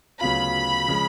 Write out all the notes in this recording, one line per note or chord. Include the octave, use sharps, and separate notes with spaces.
D2 C#3 F#3 B3 F4 B5
C#3 F3 G#3